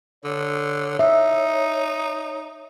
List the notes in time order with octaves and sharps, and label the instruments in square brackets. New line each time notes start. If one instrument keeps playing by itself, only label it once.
[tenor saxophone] D3 [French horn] C#5
[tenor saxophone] D#4 [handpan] E5